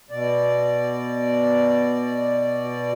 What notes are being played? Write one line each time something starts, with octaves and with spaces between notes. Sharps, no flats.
B2 D5